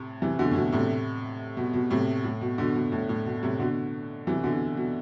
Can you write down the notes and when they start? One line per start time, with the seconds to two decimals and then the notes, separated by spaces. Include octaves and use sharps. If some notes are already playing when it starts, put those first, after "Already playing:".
Already playing: A2 C3
0.22 C3 E3
0.39 B2 D3
0.51 A2
0.56 B2
0.72 A2 C3
1.57 B2
1.73 B2
1.91 A2 C3
2.24 A2
2.41 B2
2.58 B2 D3
2.75 B2
2.92 A2
3.09 A2
3.26 B2
3.43 A2 C3
3.59 B2 D3
4.27 C3 E3
4.44 B2 D3
4.77 B2